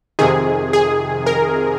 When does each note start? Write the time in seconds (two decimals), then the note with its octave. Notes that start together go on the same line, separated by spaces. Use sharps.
0.19 F2 C3 D#3 G#4
0.73 G#4
1.26 A#4